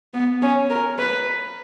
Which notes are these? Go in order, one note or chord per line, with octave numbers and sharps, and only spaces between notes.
B3
C#4
A#4
B4